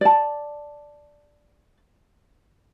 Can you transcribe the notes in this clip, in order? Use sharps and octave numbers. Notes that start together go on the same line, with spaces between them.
D5 A5